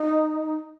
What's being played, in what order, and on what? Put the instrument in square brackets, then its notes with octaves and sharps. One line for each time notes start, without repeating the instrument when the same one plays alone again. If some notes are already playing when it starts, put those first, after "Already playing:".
Already playing: [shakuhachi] D#4